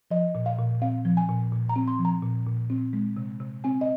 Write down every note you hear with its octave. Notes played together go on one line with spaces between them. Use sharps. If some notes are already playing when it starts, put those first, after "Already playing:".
F3 D#5
A#2
F5
A#2
C4 F5
F3
G#5
A#2
A#2
A#5
C4
C6
F3
A#5
A#2
A#2
C4
G#3
C3
C3
C4 G#5
D#5